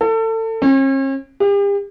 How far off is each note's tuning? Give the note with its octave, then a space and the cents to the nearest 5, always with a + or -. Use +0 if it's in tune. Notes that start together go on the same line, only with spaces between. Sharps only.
A4 +30
C#4 -45
G4 +40